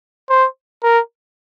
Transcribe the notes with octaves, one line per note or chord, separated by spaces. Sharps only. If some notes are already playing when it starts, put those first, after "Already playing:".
C5
A#4